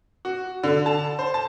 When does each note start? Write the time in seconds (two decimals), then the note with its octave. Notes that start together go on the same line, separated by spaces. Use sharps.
0.25 F#4
0.63 D3
0.86 A5
1.19 C5
1.34 A5